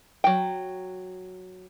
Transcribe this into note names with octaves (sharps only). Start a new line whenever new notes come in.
F#3 G5